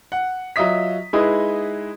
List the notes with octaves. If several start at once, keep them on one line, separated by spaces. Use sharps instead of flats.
F#5
F#3 F4 D#5 E5 D#6 B6
G#3 D#4 E4 G#4 B4 D#5